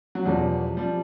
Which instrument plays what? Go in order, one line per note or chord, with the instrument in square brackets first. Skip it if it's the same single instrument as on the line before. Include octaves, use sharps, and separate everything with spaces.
[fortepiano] F#3
[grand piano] E2 B2 G#3 C#4 [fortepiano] F3 G3
[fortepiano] F3 G3